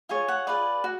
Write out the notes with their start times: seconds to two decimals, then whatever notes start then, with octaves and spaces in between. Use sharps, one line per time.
0.09 F4 G#4 C#5 G#5
0.28 F#5
0.47 F4 G#4 B4 D5
0.84 F#4